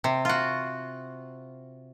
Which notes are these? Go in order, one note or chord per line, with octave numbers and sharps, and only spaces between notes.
C3
F4 F#4